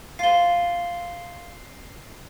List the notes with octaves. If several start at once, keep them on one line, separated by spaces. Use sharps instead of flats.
F4 C5 C7 G7